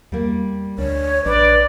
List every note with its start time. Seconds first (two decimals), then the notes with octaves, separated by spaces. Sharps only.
0.12 E2 G3 A#3
0.78 D2 D4 C#5
1.25 A#1 D4 B4 D5